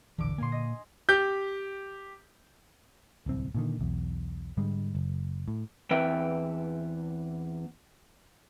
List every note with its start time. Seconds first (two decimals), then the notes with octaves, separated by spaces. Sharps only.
0.18 E1 A#1 D3 E3 D6
0.38 A#2 A#3 G#5 C6
0.52 D#5
1.09 G4 G6
3.26 D1 C2 C4
3.55 A#2 D3 D#3
3.79 B1 E2
4.57 G#2 D3 G3 G#3
4.95 F#1
5.48 A2
5.91 E2 C4 B4 E5 G5